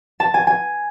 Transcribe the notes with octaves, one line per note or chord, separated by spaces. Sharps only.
A5
G#5
G#5